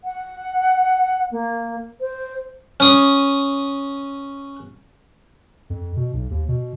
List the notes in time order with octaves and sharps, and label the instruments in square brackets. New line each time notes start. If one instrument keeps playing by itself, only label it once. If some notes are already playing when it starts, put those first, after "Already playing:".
[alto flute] F#5
A#3
C5
[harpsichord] C#4 D#6
[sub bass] F2
B2
B1
D#2
B2